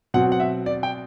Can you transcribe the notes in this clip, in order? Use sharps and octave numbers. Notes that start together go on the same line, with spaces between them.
B2 F#3 C4 F#5
F#5
E5
D5
G5